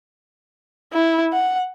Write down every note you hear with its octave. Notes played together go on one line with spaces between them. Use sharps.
E4
F#5